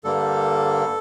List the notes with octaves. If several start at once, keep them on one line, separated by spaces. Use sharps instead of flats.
G2 D3 G3 A#3 A4